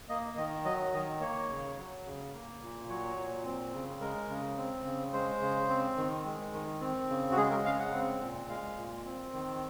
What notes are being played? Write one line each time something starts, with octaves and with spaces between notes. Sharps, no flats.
A#3 D#5
D#3 D#5
F#3 D#5
D#3 D#5
A#3 C#5
C#3
F#3
C#3
A#3
A#2
F#3 C#5
A#2
C4
C#3
G#3 A#4
C#3
C4
C#3
G#3 C5
C#3
C4
D#3
G#3
D#3
C4
C#3
F#4
G#3 G#4
A#4
C#3 F5
F#5
C4
A#2
G#3 F5
A#2
C4
D#3